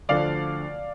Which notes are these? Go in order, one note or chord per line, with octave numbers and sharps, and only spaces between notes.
D2 D3 F3 D5 F5